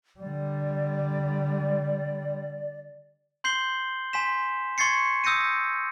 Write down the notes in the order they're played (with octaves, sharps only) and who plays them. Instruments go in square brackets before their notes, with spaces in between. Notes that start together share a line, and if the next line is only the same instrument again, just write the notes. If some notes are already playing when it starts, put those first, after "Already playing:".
[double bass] D3 G3 [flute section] D5
[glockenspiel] C6 G6 C7 F#7 G7
G#5 C6 B6 E7
C6 C#6 G#6 A6 C7 C#7
D#6 E6 G6 A#6 C#7 D#7